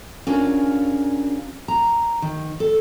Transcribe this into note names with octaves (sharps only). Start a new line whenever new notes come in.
C#4 D4 F4 F#4 G#4 A#4
A#5
D#3
A4